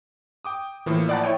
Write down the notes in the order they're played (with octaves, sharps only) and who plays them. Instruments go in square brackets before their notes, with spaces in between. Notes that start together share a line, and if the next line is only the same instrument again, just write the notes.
[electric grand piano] G5 D6 D#6
[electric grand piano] A2 F3 A#3 [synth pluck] E3
[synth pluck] D5 F#5 A5
E4 C#5 G5